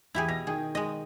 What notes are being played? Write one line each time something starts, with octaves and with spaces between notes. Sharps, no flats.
E2 E4 G4 G#4
B2 A#6
D#3 G#4 G5 G#6
G#3 D#5